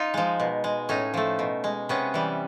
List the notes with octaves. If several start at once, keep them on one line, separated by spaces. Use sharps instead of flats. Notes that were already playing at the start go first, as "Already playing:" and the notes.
Already playing: D#4 F4
F3 G#3
B2
G#3
A2 C#4 D#4
F3 A3
B2
G#3
C3 B3 C#4
E3 G3